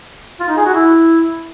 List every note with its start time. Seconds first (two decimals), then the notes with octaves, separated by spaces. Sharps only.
0.40 F4
0.48 D#4
0.57 G#4
0.65 F#4
0.74 E4